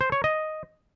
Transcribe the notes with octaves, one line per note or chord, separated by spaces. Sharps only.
C5
C#5
D#5